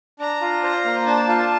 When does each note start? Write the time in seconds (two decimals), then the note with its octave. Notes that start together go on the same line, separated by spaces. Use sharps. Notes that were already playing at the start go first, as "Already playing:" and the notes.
0.19 D4 A#5
0.41 F4
0.63 C5 A#5
0.85 A#3
1.07 D4 A5
1.28 F4